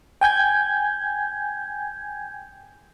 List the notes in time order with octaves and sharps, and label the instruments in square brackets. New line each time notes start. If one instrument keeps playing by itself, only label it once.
[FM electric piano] G5 G#5 G6 G#6